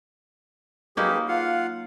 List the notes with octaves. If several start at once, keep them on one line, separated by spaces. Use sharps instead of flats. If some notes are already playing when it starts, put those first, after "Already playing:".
F#3 A#3 D#4 G4 G#4 B4
F4 F5 F#5